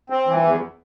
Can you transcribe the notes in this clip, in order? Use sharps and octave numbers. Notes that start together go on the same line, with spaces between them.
C4
E3
E2